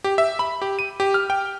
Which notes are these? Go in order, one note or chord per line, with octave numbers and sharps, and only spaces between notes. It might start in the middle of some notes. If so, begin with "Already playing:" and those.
G4
E5
B5
G4
D#7
G4
F6
G5